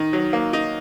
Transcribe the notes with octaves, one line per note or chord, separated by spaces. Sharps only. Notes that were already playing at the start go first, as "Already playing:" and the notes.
Already playing: D#3 D#4
F#3
A#3
D#4